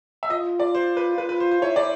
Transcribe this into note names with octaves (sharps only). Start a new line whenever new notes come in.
E5
F4 D#5
D5
C5
B4
F4 B4
B4
C5
C5
E4 C#5
D5